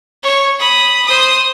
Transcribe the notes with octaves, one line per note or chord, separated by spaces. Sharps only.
C#5
B5 D#6
C5 D#6